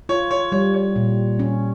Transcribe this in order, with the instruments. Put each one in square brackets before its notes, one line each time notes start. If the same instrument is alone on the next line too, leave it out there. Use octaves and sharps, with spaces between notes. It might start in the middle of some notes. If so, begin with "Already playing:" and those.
[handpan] F4 [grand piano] C#5
[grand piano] C#5
[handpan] G3 [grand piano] C#5
[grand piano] C#5
[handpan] A#2
C#4